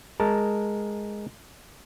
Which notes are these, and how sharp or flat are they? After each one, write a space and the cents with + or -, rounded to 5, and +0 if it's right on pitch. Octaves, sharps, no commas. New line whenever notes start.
G#3 +0 A#4 +0 A5 +0